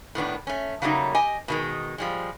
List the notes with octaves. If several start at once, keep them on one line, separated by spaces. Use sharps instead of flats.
A2 D#3 B3 D4
A3 C#4
C#3 F#3 G3 A3 A#3 D#4
G4 D#5 G#5
B2 D#3 G#3
F3 G3 G#3